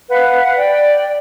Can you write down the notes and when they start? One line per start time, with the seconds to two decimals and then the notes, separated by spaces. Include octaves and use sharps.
0.09 B4 F5 F#5
0.57 D5 G5